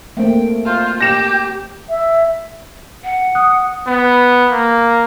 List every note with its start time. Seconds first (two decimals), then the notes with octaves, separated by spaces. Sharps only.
0.17 A3 A#3 C4 G5
0.65 F4 C5
1.01 G4 G6 A#6 E7
1.89 E5
3.04 F#5
3.35 D#6 F#6
3.87 B3
4.51 A#3